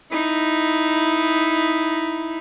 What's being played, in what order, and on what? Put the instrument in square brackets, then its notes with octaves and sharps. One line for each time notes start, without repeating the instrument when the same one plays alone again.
[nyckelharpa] D#4 E4